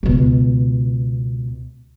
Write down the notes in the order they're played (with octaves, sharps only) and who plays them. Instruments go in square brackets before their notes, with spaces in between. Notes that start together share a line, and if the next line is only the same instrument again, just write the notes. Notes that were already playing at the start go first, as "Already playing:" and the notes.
[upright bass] C#2 B2